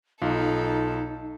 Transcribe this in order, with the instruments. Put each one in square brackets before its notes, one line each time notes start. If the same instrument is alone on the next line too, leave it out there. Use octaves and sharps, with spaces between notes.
[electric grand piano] B1 F4 [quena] D#4 [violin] A4